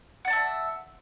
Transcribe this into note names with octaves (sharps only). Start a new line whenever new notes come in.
D5 E5 F#5 A5